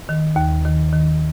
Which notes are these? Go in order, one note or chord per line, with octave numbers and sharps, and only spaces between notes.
D#3
D#2
D#3
D#3